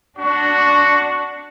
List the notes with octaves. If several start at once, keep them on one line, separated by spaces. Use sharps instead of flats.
D4 F#4